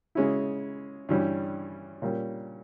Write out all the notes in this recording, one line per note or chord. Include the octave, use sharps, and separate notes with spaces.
C#3 G#3 C#4 E4
G2 E3 G3 C#4
A#2 G3 C#4